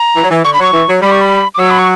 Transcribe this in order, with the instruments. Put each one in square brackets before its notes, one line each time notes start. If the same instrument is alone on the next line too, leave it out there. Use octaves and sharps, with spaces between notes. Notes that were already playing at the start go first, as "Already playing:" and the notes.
Already playing: [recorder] A#5
[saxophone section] E3
F#3
E3
[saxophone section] D3 [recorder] C#6
[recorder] B5
[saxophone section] F#3 [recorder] C#6
[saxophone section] E3
F#3
[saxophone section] G3 [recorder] B5
[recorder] C#6
B5
D6
[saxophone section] F#3 [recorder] E6
[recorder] B5
C#6